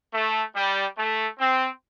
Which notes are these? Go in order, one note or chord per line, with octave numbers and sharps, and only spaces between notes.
A3
G3
A3
C4